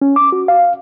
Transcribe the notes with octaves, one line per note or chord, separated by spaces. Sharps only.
C#4
D6
F#4
F5